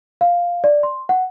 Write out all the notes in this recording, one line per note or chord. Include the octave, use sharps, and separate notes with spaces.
F5
D5
C6
F#5